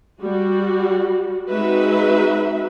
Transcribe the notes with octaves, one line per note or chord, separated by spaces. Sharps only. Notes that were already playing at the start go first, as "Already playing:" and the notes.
G3 F#4
G#3 C4 D#4 F#4 B4 E5